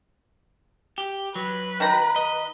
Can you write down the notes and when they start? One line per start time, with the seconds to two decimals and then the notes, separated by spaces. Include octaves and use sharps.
0.98 G4
1.35 F#3 B4
1.80 D#3 A#5
2.16 D#5